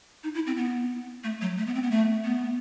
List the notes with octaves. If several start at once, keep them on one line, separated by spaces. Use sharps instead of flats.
D#4
E4
C4
B3
A3
F#3
A3
B3
C4
B3
A3
B3